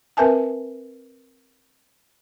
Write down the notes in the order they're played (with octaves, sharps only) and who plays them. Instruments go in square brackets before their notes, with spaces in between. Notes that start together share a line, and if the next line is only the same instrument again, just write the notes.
[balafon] C4 A#4 B4 E5 G#5 A5